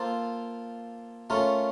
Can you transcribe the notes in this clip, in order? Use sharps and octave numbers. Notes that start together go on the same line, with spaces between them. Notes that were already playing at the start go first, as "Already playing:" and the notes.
Already playing: A#3 F4 A4 C5
A3 C#4 F4 A#4